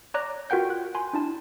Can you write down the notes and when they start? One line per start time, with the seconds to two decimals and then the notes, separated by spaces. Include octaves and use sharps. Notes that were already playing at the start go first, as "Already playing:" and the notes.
0.14 C#5 D5 A#5 D6 F#6 A#6
0.50 F4 F#4 A#4 F#5 G5 G6
0.70 F#6
0.95 G#5 B5 C6
1.13 D4 E4 A5